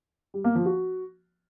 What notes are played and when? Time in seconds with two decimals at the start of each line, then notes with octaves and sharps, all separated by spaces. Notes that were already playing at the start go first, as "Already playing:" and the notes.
0.34 G3
0.44 A#3
0.55 F3
0.66 F#4